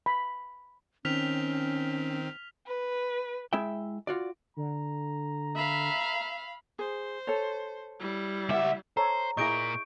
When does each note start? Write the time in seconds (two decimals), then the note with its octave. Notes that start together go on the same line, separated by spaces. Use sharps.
0.06 B5
1.05 D#3 C4 C#4 F6 B6 F7
2.67 B4
3.53 G#3 E4 E5 G5
4.07 F4 F#4 D5
4.57 D3 A#5
5.56 E5 F5 B5
6.79 G#4 C5
7.27 A4 C#5
8.00 G3 E4
8.49 C#2 G4 D5 E5 F#5
8.97 A4 C5 C#5 A#5
9.37 A#2 E4 G#4 A#4 D#5 C#6 G6 D7